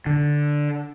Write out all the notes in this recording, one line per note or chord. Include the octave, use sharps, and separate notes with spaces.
D3